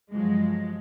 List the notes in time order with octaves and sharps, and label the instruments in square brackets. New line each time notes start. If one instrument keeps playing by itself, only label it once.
[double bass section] G2 F3 F#3 [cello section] G#3